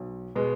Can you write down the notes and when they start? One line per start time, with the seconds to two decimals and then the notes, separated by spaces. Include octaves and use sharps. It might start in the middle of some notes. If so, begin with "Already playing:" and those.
Already playing: B1
0.36 B2 G#3 B3